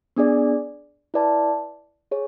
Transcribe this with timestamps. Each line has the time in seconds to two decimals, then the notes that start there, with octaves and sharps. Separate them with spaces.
0.17 B3 D4 G#4 D5
1.14 E4 B4 D5 A5
2.11 G#4 C#5